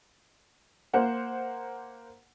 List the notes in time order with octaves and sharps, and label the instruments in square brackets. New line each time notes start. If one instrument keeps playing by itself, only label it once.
[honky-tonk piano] A#3 C5 F#5